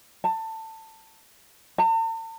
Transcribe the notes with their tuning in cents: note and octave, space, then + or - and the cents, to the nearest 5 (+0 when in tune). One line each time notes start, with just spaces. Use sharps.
A5 +20
A5 +45